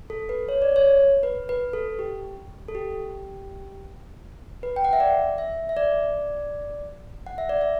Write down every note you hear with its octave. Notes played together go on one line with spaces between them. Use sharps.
A4
B4
C#5
D5
C#5
B4
B4
A4
G4
A4
G4
B4
G5
F#5
E5
D5
E5
E5
D5
F#5
E5
D5
E5